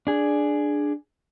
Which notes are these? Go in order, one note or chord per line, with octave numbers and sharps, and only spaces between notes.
D4 G#4